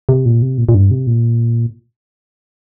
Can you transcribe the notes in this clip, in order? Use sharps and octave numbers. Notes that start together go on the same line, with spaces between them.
C3
A#2
C3
A#2
A#2
G2
C3
A#2